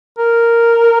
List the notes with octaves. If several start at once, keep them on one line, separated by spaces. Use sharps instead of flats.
A#4